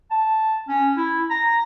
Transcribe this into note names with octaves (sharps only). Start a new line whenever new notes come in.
A5
C#4
E4
A#5